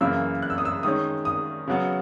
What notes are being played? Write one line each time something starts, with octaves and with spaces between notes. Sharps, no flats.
F#2 C#3 E3 A#3 E6
F#6
E6
D#6
E6
D#3 G#3 C#4 D#6
D#6
C#3 F#3 B3